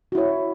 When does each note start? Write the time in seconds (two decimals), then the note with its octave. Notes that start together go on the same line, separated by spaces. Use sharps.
0.12 F#4
0.15 E4
0.18 C#5